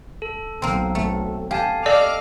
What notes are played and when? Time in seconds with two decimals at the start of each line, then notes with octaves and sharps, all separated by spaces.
0.22 A4
0.62 B1 A#3 C4
0.95 A3
1.51 G4 F5 G#5 A5
1.86 A4 D5 D#5 F5 D6 F6